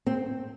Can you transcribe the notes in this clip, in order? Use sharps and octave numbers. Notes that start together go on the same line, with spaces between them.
C4